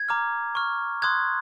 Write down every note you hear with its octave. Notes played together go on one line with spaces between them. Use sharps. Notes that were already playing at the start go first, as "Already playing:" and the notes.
Already playing: G#6
A#5 D6 F6
C#6 F6
C6 D#6 F#6 G#6